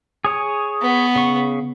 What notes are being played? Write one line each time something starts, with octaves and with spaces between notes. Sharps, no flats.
G#4 C#5 D#6
B3
C#3 C#6